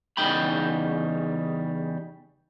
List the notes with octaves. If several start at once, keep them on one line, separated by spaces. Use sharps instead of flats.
E2 C#3 G3 D#4 G5 B5